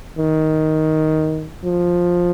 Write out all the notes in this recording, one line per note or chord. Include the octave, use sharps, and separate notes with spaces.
D#3
F3